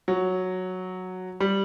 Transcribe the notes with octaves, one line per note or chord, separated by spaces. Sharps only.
F#3
G3